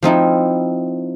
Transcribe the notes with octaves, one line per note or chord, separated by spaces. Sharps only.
F3 C4 D#4 E4